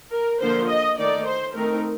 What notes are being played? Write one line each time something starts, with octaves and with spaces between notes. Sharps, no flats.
A#4
D3 F3 A#3 C5
D#5
D#3 A3 D#4 D5
C5
D#3 A3 C4 D#4 A#4